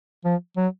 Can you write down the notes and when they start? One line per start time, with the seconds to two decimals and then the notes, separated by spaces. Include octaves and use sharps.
0.25 F3
0.57 F#3